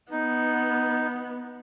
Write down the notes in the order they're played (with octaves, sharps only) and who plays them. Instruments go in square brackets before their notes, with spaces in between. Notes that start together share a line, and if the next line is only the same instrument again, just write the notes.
[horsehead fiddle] B3 [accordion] D#4